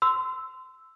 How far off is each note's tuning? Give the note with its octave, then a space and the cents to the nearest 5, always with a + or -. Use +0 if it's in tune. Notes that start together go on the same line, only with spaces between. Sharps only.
C6 -25 E6 +0